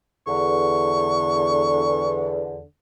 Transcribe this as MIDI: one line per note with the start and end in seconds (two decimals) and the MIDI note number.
0.27 2.61 40
0.27 2.61 50
0.27 2.30 85